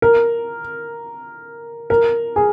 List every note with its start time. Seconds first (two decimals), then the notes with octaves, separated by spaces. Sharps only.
0.02 A#4
1.90 A#4
2.36 G#4